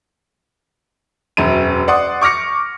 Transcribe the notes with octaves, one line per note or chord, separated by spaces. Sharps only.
E1 F#2 D#7
D5 F#5 C6 D#6
C#6 D6 F6 A#6 C#7